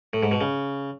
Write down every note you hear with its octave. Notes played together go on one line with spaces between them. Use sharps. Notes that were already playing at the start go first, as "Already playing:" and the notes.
A2
G#2
B2
C#3